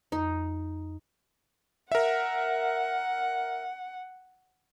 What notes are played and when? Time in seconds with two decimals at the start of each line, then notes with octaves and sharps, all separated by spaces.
0.12 F2 D#4
1.92 A#4 E5 F#5